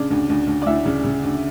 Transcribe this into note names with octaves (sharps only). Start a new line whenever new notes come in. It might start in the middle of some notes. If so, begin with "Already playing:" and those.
Already playing: C#3 D4 D5
D2
D2
D2
D5
D2 E4 E5
C#3
C#3
D2